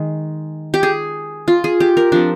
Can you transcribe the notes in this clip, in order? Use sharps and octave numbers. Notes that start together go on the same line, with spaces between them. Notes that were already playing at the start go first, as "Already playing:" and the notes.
Already playing: D#3 G#3
G4
G#4
F4
G#4
G4
A#4
F3 C4 D4